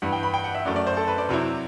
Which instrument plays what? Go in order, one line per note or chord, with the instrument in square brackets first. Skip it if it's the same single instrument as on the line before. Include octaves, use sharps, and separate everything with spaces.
[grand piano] G2 E3 G3 F#5
G5
B5
G5
F#5
E5
F#2 F#3 A3 D5
D5
C5
A4
B4
D5
C3 F#3 C4 E4